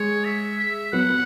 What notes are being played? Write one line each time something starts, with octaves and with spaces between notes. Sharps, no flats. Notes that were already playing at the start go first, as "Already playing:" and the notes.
Already playing: G#3 C#5
E5
E5
F#3 B3 F#5
B3